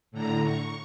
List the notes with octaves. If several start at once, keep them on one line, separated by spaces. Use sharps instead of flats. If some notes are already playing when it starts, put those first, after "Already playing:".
A2 D3 A#5
C#6